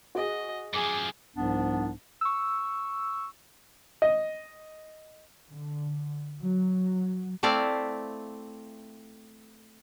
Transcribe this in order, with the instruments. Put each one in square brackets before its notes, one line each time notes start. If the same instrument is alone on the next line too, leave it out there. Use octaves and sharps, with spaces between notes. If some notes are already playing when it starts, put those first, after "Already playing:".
[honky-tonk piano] F#4 G#4 [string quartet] D#5
[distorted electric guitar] F#2 F3 [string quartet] G#4 [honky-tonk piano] D6
[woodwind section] C2 G#2 F3 B3 D4
[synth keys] C#6 E6
[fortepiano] D#5
[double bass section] D3
F#3
[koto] A3 C4 E4 D5 F5